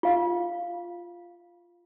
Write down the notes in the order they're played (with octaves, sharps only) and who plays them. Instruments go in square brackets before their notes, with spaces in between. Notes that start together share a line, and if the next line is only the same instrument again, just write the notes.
[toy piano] F4 F5